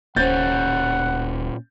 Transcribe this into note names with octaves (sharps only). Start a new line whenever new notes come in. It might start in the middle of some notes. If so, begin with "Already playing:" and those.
D1 A#2 C#4 C5 F#5 G6 A6